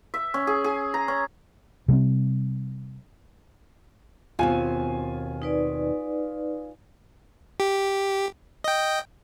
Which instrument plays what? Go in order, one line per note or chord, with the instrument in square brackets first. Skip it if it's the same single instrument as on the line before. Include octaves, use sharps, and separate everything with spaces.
[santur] E5
C#4
G#4
G#4
A#5
C#4
[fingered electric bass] C3 G3 B3 C4
[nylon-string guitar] D#2 B2 C4 [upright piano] F4 G#5
[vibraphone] D#4 B4 D5
[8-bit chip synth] G4
D#5 G5